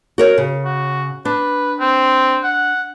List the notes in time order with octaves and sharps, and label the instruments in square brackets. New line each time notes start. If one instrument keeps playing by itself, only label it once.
[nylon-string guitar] F#4 A#4 C#5
C#3
[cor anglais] F#4
[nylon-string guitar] D4 [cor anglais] B4
[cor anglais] C4
F#5